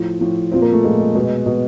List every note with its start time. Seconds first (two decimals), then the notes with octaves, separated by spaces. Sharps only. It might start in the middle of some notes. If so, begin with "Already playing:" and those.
Already playing: A2 F3
0.21 A2 F3
0.52 A#2 F3 C4
0.62 A#3
0.72 A3
0.83 A#2 F3 G#3
0.99 G#3
1.15 B2 G#3
1.46 B2